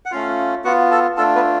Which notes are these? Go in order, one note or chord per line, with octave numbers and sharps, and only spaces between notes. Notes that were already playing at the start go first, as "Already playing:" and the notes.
F#5
A3 C#4 F4 F5
B3 F4 F#4 F#5
A4 A5
A3 D4 F4 A4 A5
B3 B4